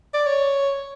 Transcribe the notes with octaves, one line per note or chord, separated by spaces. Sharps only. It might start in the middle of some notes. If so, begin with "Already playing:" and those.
D5
C#5